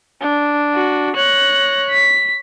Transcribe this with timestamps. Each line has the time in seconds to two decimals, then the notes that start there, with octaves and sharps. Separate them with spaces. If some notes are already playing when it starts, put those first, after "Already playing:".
0.21 D4
0.75 F#4
1.16 C#5 F#6 A#6
1.89 B6